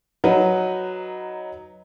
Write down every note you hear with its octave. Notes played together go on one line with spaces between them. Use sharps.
F#3 D#4 B4